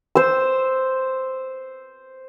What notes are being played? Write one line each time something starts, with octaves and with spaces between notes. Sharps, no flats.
C5 E6